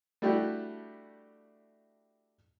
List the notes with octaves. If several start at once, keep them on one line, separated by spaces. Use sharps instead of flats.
G3 A3 D4 E4 F#4 G4